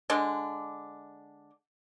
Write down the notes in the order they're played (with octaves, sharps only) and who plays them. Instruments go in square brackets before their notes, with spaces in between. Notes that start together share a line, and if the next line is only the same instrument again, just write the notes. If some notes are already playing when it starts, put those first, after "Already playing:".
[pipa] D3 G#3 D4